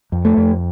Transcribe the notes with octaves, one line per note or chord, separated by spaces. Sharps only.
F2
A3
F2